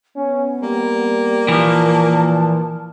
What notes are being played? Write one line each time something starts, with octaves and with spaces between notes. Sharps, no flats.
B3 C#4
G3 A#3
A#2 E3 F3 A5